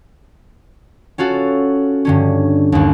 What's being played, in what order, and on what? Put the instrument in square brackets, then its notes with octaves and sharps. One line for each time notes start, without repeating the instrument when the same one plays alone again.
[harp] C#4 F4 F#4 A4
G2 D3 C#4
G1 D#2